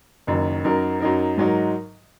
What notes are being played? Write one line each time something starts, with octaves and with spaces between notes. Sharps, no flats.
F#1 F#2 D#3
F#2 F#3 D#4 A#4
F#2 F#3 D#4 A#4
G#2 F#3 D#4 A#4